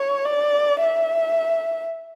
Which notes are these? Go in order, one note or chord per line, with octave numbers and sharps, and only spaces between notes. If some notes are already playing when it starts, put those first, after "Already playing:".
Already playing: C#5
D5
E5